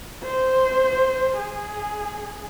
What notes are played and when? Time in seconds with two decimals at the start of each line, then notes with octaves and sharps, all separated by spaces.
0.23 C5
1.38 G#4